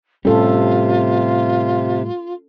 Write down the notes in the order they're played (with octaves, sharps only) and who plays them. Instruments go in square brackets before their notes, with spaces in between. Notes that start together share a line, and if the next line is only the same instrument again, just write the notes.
[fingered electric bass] A2 G3 [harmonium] C3 [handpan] C#4 A4 [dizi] F4